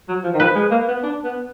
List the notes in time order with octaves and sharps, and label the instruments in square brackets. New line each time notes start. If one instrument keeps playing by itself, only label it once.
[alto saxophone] F#3
F3
D#3
[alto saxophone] F3 [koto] B4
[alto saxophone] G#3
A#3
B3
D4
B3